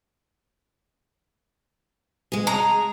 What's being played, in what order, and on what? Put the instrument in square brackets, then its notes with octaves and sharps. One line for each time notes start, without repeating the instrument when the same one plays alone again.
[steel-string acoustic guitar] G#3 G#4
[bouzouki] A#5